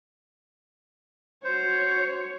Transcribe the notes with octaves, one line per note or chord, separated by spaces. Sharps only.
F#4 C5 C#5